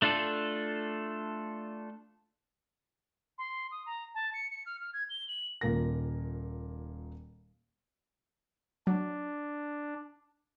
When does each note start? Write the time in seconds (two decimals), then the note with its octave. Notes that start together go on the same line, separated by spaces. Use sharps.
0.02 A3 D4 F4 A4
3.38 C6
3.71 D#6
3.86 A#5
4.15 A5
4.34 C#7
4.50 C#7
4.66 F6
4.81 F6
4.93 G#6
5.10 G7
5.28 F#7
5.61 D#1 A#2 A#4 A#6
8.87 F#3 D4